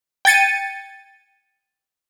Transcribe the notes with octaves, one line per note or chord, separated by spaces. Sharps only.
G5 G#6 A6 C#7 D#7